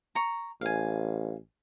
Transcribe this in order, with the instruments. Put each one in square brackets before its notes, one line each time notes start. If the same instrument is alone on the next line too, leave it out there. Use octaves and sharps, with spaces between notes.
[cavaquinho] A#5 C#6
[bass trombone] A1 [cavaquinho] F5 G#5